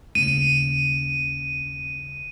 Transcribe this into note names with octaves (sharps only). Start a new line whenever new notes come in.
D#2 C#3 D#7